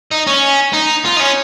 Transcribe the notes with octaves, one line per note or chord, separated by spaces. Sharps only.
D#4
C#4
D#4
F4
D#4
C#4